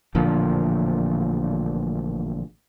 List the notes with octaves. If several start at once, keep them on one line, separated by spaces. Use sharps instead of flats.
A1 A#2 D3 F3